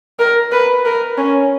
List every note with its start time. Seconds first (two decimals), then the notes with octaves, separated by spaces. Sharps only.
0.20 A#4
0.53 B4
0.85 A#4
1.18 C#4